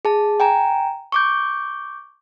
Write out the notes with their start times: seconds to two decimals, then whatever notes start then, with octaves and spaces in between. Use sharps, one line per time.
0.05 G#4 A5
0.40 G5 G#5 A#5
1.12 C#6 D6 G6